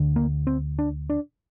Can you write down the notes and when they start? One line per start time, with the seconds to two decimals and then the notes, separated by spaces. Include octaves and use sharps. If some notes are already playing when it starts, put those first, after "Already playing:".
Already playing: D2 D3
0.16 A#3
0.47 C4
0.79 D4
1.10 D4